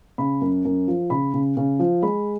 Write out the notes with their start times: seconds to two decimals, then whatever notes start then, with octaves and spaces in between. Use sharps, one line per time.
0.18 C#3 B5
0.41 F#2
0.65 F#2
0.88 F3
1.10 C#3 B5
1.34 C#3
1.57 C#3
1.79 F3
2.03 G#3 B5